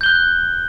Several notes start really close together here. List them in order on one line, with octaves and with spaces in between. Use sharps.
G6 G7 F#6